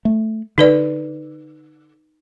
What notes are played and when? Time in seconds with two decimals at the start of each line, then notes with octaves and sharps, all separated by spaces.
0.05 A3
0.58 D3 D#4 B4 D5